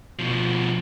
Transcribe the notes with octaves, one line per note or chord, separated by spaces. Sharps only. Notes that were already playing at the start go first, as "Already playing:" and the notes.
B2 F3